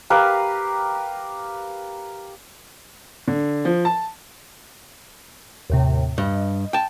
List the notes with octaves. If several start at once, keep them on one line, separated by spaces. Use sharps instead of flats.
G4 A#4 B4 F5
D3
F3
A5
D#2 A2 C3
G2 D#5
G5 A5